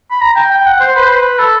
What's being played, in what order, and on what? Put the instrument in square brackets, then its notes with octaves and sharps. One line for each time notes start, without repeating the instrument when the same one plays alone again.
[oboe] B5
A#5
G5
G5
F#5
C5
B4
C5
B4
A4